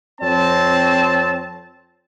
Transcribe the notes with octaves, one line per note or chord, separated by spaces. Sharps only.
F2 C4 C#5 A5